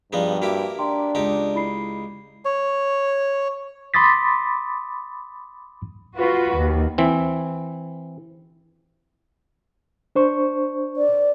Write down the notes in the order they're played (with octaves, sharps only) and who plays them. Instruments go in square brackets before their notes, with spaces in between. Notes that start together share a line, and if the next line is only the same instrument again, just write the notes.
[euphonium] G2 [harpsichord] F3 B3 D#4 [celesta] G#4 D5 F5
[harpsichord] A#3 E4 G4 [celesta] F#4
[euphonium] D4 [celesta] G5 A#5 C6
[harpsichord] C#2 D#4 G4
[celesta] E4 B5 C7
[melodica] C#5
[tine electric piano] B5 C6 D6 D#6 A6 B6
[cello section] F4 F#4 B4
D#2
[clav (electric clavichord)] E3 C4
[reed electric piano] D4 C5 C#6
[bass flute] D5